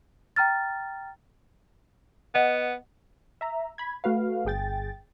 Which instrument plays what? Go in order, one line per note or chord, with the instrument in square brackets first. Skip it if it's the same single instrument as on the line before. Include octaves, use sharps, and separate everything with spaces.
[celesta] G5 A#5 F6 A6
[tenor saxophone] B3 [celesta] D#5 F#5
[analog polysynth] E5 A#5
B5 G#6
A3 F#4 B4 F5
G1 G#4 G5 A6